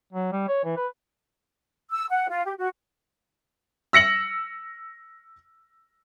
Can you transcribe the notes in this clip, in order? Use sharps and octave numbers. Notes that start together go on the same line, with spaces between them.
F#3
G3
C#5
E3
B4
E6
F#5
F4
G4
F#4
E6 A#6 C#7 F#7